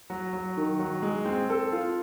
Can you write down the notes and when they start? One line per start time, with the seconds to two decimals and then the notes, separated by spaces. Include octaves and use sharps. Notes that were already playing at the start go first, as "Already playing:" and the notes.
0.10 F#3
0.33 F#3
0.57 D#3
0.79 F#3
1.02 G#3
1.25 C4
1.49 A4
1.72 F4